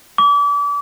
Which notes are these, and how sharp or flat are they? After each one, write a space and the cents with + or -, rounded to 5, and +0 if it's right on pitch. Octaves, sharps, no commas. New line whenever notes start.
D6 -35